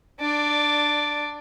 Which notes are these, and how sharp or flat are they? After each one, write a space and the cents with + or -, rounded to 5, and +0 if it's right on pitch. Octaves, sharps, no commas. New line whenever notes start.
D4 +15 D5 +0